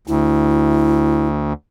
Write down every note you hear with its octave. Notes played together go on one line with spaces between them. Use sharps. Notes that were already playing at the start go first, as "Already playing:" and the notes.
D2 E4